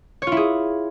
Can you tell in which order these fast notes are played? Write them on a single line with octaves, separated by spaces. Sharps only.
C#5 F4 E4 G#4